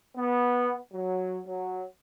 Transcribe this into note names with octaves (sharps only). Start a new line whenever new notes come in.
B3
F#3
F#3